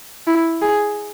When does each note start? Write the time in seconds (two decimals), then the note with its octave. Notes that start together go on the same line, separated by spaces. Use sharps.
0.27 E4
0.62 G#4